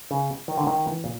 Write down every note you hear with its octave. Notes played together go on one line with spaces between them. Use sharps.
C#3
D#3
D3
D#3
E3
A#2